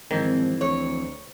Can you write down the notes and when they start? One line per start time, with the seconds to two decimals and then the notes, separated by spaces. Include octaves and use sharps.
0.11 G#1 F2 D#3 E3 C4
0.61 D2 C#5